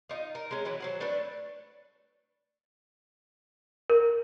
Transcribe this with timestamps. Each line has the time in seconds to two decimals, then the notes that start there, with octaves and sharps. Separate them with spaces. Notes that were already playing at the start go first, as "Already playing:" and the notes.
0.09 D#4 F4
0.35 A#4
0.51 G#3 C#4
0.65 E3 F#3 B4
0.80 F#3 C5 F#5
1.00 A3 D4 A4 B4
3.90 A#4